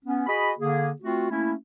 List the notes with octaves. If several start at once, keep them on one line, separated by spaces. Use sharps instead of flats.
B3 C#4
F#4 G#4 D#5 B5
D3 A#3 G#4
A3 C4 F4 F#4
A3 A#3 C#4 E4